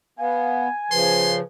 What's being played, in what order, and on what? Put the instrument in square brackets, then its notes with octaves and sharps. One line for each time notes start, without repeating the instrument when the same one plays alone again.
[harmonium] B3 [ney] F5 [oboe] G#5
[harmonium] C#3 F3 [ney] B4 [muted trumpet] C6